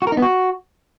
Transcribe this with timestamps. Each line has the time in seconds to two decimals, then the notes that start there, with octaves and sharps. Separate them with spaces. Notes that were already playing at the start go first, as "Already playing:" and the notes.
0.02 F#4
0.07 A#4
0.12 D#4
0.17 B3
0.22 F#4